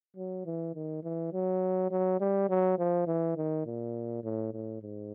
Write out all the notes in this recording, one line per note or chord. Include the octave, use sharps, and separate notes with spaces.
F#3
E3
D#3
E3
F#3
F#3
G3
F#3
F3
E3
D#3
A#2
A2
A2
G#2